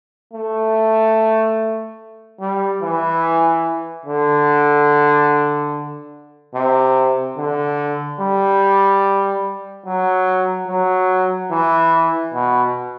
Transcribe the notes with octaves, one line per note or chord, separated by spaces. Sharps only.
A3
G3
E3
D3
C3
D3
G3
F#3
F#3
E3
B2